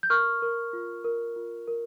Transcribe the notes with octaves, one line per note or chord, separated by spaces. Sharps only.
G6
A#4 C#6 F6
A#4
F4
A#4
F4
A#4